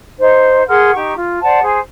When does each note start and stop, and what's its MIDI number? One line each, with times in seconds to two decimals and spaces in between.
0.19 0.63 63
0.19 0.63 72
0.67 0.93 68
0.67 0.93 70
0.67 0.93 78
0.67 0.93 84
0.94 1.12 63
0.94 1.12 67
0.94 1.12 85
1.15 1.39 65
1.41 1.61 72
1.41 1.61 74
1.41 1.61 78
1.41 1.61 81
1.61 1.79 68
1.61 1.79 72